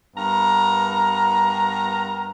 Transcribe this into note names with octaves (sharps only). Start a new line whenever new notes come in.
G2 B3 A#4 A#5